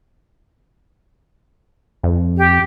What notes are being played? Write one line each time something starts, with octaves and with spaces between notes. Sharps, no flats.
F2
G4